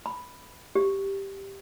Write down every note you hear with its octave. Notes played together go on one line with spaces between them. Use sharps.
B5
G4